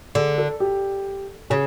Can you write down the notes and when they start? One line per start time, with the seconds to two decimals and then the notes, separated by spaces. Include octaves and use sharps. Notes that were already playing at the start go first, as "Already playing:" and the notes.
0.15 D3 G#4
0.38 A4
0.60 G4
1.50 C#3 G#4